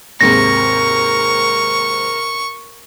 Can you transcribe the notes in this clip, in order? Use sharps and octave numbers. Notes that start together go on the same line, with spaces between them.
D#2 G#2 C3 A#4 C#6 A#6